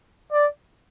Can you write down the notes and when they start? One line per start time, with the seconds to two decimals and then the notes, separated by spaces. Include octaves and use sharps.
0.32 D5